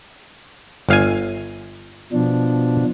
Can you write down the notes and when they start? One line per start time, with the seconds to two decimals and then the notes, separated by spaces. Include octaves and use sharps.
0.89 G1 F5 G#5
2.13 B2 F3 D4